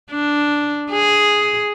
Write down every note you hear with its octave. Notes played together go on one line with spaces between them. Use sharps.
D4
G#4